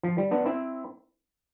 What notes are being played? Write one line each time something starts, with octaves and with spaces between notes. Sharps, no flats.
F3
G3
B3 D4
C4 E4